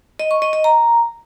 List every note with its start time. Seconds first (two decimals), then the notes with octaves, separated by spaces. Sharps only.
0.19 D#5
0.31 C#6
0.42 D#5
0.53 D#5
0.64 A#5